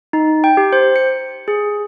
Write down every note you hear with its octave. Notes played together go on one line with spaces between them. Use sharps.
D#4
G5
G4
C5
C#7
G#4